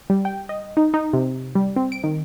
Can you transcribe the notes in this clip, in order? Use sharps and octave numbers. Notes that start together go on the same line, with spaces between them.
G3
G5
D#5
D#4
D#4
C3
G3
C4
D7
D#3